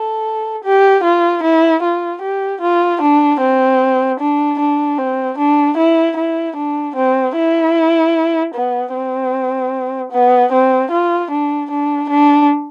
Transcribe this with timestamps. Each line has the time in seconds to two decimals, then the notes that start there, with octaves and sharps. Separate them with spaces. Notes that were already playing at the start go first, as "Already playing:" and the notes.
Already playing: A4
0.64 G4
1.03 F4
1.43 E4
1.82 F4
2.22 G4
2.61 F4
3.01 D4
3.40 C4
4.20 D4
4.59 D4
4.98 C4
5.38 D4
5.77 E4
6.17 E4
6.56 D4
6.96 C4
7.36 E4
8.54 B3
8.94 C4
10.12 B3
10.52 C4
10.91 F4
11.30 D4
11.71 D4
12.10 D4